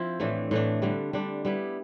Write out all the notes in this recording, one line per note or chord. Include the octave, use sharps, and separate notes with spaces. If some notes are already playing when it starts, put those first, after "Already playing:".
Already playing: F3 C4 E4
A2 E3 A3 D4
A2 E3 A3 D4
D3 G3 D4
D3 G3 D4
G3 B3 E4